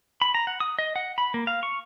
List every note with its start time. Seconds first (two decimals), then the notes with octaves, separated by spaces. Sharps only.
0.22 B5
0.34 A#5
0.47 F#5
0.60 D#6
0.79 D#5
0.96 F#5
1.18 B5
1.34 A#3
1.47 F5
1.63 C#6